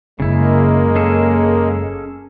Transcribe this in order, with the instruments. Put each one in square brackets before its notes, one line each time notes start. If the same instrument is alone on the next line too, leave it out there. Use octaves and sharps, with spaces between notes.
[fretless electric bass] F#1 [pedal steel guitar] C#3 E4 [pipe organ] G#3 A#3
[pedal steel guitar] C#4 G#4 A4